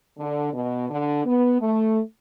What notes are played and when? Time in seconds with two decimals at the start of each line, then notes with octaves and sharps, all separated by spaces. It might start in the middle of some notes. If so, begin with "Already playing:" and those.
0.18 D3
0.54 B2
0.89 D3
1.25 B3
1.61 A3